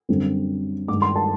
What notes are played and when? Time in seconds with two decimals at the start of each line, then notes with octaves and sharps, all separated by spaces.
0.09 F#2 D3 G3 C4
0.88 G2 D#3 G#3 D6
1.02 C6
1.16 A5